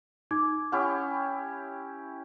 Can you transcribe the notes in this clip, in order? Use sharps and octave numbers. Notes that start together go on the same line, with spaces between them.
D#4 D6 G#6
C#4 E4 G4 F#5